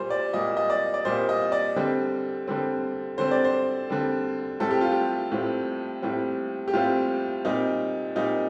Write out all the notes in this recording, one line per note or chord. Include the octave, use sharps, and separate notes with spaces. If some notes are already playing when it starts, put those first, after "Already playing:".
Already playing: A#2 G3 A#3 C5
D5
A#2 G3 A#3 D#5
D#5
D5
D5
A#2 G3 A#3 C5
D#5
D5
D3 G3 C4
D3 G3 C4
D3 G3 C4 C5
D5
C5
D3 G3 C4
A2 G3 C4 A4
G4
F4
G4
A2 G3 C4
A2 G3 C4
G4
A2 G3 C4 F4
A#2 G3 C4 D#4
A#2 G3 C4 D#4